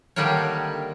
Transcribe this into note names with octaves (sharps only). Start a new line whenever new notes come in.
D3 D#3 G3 A#3 D4 C#5